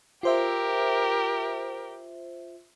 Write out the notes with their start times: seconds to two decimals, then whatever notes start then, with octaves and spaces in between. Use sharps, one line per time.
0.23 F4 G4 A#4 C5 E5